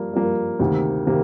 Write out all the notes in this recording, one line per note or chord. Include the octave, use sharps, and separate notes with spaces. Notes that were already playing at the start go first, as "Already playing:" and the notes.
Already playing: G2 F3 A#3
G2 F3 A#3
D2 C3 D#3 A#3
C3 D#3 A#3